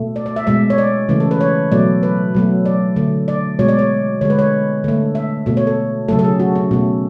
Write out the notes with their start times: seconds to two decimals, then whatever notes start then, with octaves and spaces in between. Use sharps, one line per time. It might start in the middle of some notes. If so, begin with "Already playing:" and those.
Already playing: B2 A3
0.16 D5
0.26 D5
0.36 E5
0.47 B2 G#3 E5
0.70 C#5
0.78 D5
1.09 C#3 E3 A3
1.20 A4
1.31 B4
1.41 C#5
1.72 B2 F#3 A3 D5
2.03 B4
2.35 B2 F#3 A3
2.66 D5
2.96 D3 A3
3.28 D5
3.59 B2 G#3 C#5
3.68 D5
3.79 C#5
4.21 D3 G#3 C#5
4.30 B4
4.39 C#5
4.84 D3 A3
5.15 E5
5.46 B2 A3
5.57 C#5
5.67 A4
6.08 C#3 F#3 A3 A4
6.19 A4
6.24 G#4
6.40 F#4
6.55 C#4
6.71 B2 A3